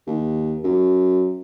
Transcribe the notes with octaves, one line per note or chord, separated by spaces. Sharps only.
D#2
F#2